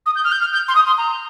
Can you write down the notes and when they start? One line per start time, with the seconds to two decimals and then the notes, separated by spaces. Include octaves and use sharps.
0.06 D#6
0.15 G6
0.24 F6
0.31 G6
0.40 F6
0.53 G6
0.68 C6
0.75 D#6
0.86 C6
0.97 A#5